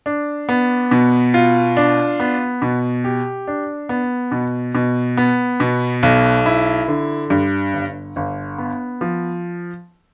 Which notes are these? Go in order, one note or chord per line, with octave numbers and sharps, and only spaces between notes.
D4
B3
B2
F4
D4
B3
B2
G4
D4
B3
B2
B2
B3
B2
B1
E4
D3
G2
G1
G1
B3
F3